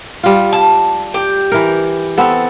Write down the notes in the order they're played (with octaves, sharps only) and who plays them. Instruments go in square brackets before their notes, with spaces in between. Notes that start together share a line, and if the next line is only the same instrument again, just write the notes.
[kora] G3 F4
[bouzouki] A5
G4
[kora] E3 A#4
B3 C4 A4